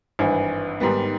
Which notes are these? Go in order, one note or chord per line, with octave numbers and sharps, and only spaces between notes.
G#1 G2 E3
G#2 D#3 G3 B3